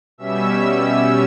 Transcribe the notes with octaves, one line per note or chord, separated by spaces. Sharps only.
B2 G3 C#4 E5 E6
E5 E6